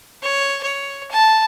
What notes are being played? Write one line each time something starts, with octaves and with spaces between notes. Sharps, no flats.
C#5
C#5
A5